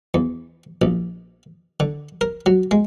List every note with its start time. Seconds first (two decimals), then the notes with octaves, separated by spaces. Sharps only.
0.14 E2
0.82 A#1
1.80 D3
2.21 A#4
2.46 F#3
2.71 G#3